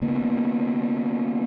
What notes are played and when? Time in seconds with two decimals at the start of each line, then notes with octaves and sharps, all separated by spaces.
0.02 C#3 A#3 B3